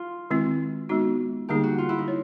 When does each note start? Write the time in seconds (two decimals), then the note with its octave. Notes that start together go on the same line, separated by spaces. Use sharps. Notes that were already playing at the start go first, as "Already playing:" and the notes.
Already playing: F4
0.30 D#3 G#3 C4 E4
0.89 G#3 B3 D#4 F#4
1.48 D3 G3 A#3 D#4 G4 G#4
1.63 F#4
1.78 F4
1.89 E4
1.98 D#4
2.08 C#5